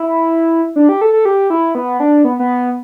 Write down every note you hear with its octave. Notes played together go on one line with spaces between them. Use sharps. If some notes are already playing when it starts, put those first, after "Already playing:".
Already playing: E4
D4
G4
A4
A4
G4
E4
B3
D4
B3
B3